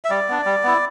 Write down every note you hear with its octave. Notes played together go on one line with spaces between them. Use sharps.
E5
G3 D5
B3 D4
G3
B3 E4